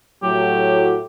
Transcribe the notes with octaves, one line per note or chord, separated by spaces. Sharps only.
A2 F#3 G4